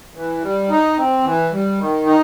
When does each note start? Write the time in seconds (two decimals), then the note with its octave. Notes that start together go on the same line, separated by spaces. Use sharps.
0.15 E3
0.43 G3
0.70 D#4
0.98 C4
1.25 E3
1.52 G3
1.79 D#3
2.06 D#4